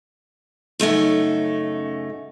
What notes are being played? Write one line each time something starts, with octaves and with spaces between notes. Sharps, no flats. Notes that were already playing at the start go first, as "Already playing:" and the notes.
F#2 C#3 A3 D#4